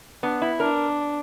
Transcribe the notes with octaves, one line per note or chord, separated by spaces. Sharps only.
B3 D4
E4
D4 A#4